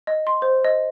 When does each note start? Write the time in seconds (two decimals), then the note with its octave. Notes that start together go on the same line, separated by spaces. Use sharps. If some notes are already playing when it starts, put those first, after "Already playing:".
0.07 D#5
0.27 C6
0.42 C5
0.65 D#5